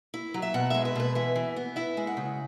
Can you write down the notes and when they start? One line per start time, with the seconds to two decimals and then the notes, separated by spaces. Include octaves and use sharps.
0.14 E4
0.34 F#3
0.42 E5
0.54 B2 F#5
0.70 G#3 E5
0.85 B4
0.95 B2 B4
1.15 E3 E5
1.35 E3
1.56 B3
1.76 E4 E5
1.97 G#3
2.07 F#5
2.17 C#3